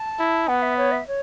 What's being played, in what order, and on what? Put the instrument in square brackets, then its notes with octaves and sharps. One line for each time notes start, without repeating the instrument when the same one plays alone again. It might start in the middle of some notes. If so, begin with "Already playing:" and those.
Already playing: [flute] A5
[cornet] E4
[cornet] B3 [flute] F#5
[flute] E5
C#5
E5
C#5